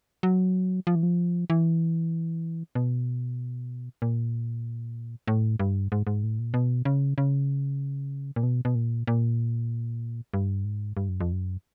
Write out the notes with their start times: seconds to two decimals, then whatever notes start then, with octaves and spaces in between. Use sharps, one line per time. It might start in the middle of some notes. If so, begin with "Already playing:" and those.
0.23 F#3
0.87 F3
0.95 E3
1.03 F3
1.50 E3
2.75 B2
4.02 A#2
5.28 A2
5.60 G2
5.92 G#2
6.07 G#2
6.23 A2
6.39 A#2
6.54 B2
6.85 C#3
7.18 C#3
8.36 A#2
8.43 B2
8.65 B2
8.75 A#2
9.07 A#2
10.34 G2
10.64 G#2
10.97 G2
11.09 F#2
11.21 F2
11.32 F#2